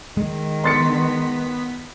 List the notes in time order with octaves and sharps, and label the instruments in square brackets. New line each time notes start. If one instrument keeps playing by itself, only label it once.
[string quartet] D#3 [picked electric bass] G#3
[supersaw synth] B3 B6 [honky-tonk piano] C6 A6 C#7